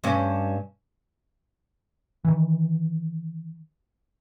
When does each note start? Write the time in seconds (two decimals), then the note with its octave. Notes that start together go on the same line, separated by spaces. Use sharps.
0.04 G2 C#4
2.25 D#3 E3